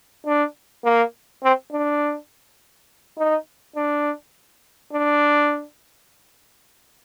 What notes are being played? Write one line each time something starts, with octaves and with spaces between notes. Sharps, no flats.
D4
A#3
C4
D4
D#4
D4
D4